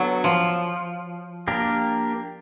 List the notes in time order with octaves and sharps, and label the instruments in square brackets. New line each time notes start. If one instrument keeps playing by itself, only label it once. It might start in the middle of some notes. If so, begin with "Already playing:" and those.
Already playing: [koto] F#3 [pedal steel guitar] B3 D4 F#4 A4 C#5
[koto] F3
[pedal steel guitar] A#3 D4 G4 A#4